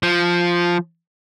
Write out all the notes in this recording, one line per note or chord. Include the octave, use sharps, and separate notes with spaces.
F3